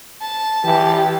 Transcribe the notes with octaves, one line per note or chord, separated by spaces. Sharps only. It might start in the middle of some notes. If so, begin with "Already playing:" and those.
A5
E3 G4